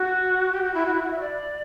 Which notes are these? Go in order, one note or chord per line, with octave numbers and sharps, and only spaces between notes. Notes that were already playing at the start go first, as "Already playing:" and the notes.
Already playing: F#4
G4
F#4
E4
F#4
E4
F#4
E5
D5